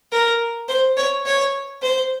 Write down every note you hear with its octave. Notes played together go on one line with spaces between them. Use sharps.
A#4
C5
C#5
C#5
C5